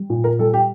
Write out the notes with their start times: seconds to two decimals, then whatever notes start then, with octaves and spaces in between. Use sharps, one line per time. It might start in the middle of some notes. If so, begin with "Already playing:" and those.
Already playing: G3
0.10 A#2
0.24 A#4
0.39 G3 A4
0.54 G4